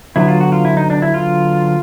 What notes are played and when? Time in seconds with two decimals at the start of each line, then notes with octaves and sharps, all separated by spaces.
0.16 D3 F#3 B3 E4
0.28 F4
0.41 F#4
0.52 F4
0.65 E4
0.77 D#4
0.90 D4
1.02 E4
1.14 F4